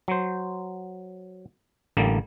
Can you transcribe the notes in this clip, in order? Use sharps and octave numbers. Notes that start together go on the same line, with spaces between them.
F#3 C5
A1 D3 G3 A#3